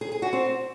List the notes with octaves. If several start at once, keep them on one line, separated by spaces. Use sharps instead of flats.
G#4
G#4
F#4
C4